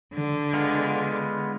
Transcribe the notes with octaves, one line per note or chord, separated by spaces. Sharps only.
D3
G#3 B3 F4